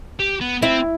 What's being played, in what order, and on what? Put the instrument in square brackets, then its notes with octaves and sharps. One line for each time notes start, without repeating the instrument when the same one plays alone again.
[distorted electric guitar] G4
B3
[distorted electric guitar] C4 [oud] E4